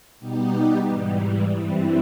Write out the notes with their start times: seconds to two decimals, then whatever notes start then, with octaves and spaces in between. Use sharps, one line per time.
0.19 B2 G3 B3 D#4 G4
0.87 G#2 E3 G3
1.54 G2 E3 G3 C4 E4